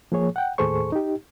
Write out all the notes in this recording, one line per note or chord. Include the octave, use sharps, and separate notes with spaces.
F3 A#3 G#4 C#5
F#5 G5
D#2 A2 G#4 A4 C5 C#6
D#4 G4